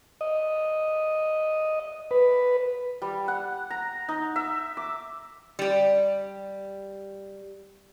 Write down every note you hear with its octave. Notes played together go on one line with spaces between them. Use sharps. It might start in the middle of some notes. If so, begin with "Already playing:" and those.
D#5
B4
G3
F#5
A#5
D#4
E5
D6
G3 G4